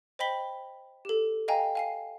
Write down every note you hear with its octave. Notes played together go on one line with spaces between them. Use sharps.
C5 D#5 G5 B5 B6 G7
G4 A4
D#5 F5 G5 G#5 A#5
F5 G#5 C7